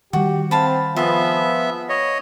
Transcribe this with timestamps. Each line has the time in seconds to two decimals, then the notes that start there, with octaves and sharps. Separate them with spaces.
0.13 D#3 G3 F#4 G4
0.51 C4 F5 A5 B5
0.96 F3 B3 F4 G#4 B4 E5
1.89 C#5 D#5